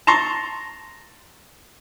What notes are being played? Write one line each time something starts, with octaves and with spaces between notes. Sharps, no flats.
A5 A#5 C6 C#6